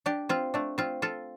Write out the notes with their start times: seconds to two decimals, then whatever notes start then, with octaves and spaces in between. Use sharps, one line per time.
0.06 D4 G4
0.29 C4 F4
0.54 A3 D4
0.78 C4 F4
1.02 F4 A4